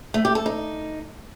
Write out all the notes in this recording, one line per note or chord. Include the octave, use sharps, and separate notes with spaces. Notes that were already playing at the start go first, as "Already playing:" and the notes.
A3
G4
A4
D#4